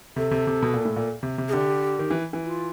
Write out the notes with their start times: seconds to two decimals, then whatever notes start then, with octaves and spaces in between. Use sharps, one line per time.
0.16 C3 A4
0.31 C3
0.47 C3
0.62 B2
0.74 A#2
0.85 A2
0.96 A#2
1.23 C3
1.38 C3
1.48 G#4
1.53 D3 G4
1.99 D#3
2.10 E3
2.33 E3
2.44 F4